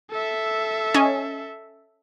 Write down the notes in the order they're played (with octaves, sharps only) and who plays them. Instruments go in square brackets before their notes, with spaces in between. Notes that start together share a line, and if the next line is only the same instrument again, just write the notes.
[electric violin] A4 E5
[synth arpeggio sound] C#4 D#5 G#5